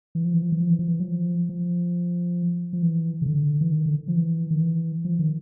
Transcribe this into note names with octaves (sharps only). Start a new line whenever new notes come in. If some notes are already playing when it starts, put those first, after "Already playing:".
E3
F3
E3
F3
E3
F3
E3
F3
E3
F#3
F3
F3
F3
E3
C#3
D3
E3
D#3
D3
F3
E3
D#3
E3
F3
D#3